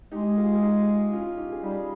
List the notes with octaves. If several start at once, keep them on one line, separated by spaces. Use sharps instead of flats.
G#3 D#4 G4
F4 G#4
G#4
D#4 G4
C#4 F4
D#4 G4
G#4
G3 D#4 G4